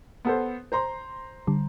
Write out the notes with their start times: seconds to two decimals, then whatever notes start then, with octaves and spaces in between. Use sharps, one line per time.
0.25 B3 A4 C5
0.72 C5 A#5 C6
1.47 D3 G3